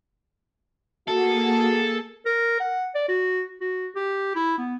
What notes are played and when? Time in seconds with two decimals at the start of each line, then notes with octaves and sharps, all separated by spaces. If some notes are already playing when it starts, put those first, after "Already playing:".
1.08 A#3 F#4 G#4 A4
2.26 A#4
2.60 F#5
2.95 D5
3.08 F#4
3.61 F#4
3.96 G4
4.35 E4
4.58 B3